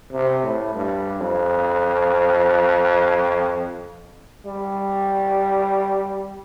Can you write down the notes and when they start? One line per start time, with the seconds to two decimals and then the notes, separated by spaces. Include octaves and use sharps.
0.13 C3
0.44 A2
0.75 G2
1.21 F2
4.45 G3